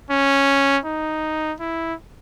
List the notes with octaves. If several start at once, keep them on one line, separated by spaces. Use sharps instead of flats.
C#4
D#4
E4